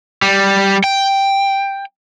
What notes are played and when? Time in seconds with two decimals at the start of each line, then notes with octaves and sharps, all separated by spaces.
0.22 G3
0.84 G5